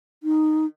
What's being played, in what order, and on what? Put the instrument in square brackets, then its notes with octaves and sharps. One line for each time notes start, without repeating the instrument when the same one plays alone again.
[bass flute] D#4